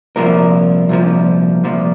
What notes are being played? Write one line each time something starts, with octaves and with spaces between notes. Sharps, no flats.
C2 A#2 F3 A#4
C2 A#2 F3
C2 A#2 F3